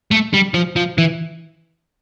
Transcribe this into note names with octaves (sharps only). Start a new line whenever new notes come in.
A3
G3
F3
F3
E3